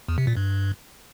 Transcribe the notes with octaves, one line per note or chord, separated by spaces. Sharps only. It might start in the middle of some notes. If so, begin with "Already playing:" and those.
E2
C3
A#2
G2